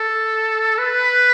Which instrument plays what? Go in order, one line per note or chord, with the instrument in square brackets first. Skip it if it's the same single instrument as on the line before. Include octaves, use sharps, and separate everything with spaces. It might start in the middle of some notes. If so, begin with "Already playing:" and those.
Already playing: [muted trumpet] A4
B4